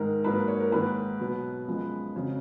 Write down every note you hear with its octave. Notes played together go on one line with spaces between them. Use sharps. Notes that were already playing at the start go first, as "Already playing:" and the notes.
Already playing: G#2 D#3 G#3 A#4
G#2 F#3 A#3 B4
C#5
A#4
G#2 D#3 A#3 B4
B2 F#3 B3
F#2 F3 G#3 B3
F2 C#3 F#3